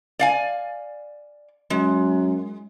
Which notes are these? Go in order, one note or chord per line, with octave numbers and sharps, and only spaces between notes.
D5 F5 G#5
F#2 G#3